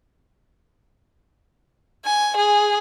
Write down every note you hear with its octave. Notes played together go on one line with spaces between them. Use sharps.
G#5
G#4